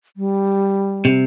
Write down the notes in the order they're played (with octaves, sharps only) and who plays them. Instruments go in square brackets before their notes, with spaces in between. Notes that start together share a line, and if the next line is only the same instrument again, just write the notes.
[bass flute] G3
[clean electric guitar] C3